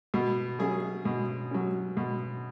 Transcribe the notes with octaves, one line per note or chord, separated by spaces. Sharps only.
B2
F#3 C#4 G#4
B2
F#3 C#4
B2